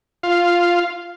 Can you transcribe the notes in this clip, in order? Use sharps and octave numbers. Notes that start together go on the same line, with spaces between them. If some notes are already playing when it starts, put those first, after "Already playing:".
F4 F5